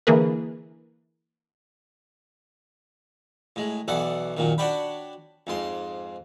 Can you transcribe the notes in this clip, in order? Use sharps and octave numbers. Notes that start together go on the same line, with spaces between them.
D3 E3 A#3 G#4 A#4 B4
A2 G#3
B1 E3 A4 D5 F#5
F#2 A#2 D#3
D4 F#4 C#5 D5 G5 B5
F2 G#2 C6